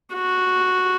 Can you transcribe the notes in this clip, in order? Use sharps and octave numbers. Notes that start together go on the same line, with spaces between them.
F#4